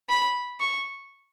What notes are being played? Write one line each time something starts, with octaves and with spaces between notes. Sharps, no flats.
B5
C#6